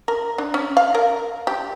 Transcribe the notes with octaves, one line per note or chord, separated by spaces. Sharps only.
A#4
D4
C#4
F5
A#4
G4